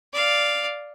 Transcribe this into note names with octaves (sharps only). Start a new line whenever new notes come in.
D5 F5